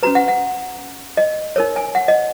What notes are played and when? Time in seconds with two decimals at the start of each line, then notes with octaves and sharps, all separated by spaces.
0.03 C#4 F#4 B4 A#5
0.15 F#5
0.28 F#5
1.17 D#5
1.56 D#4 A#4 C#5
1.76 G#5
1.95 F#5
2.08 D#5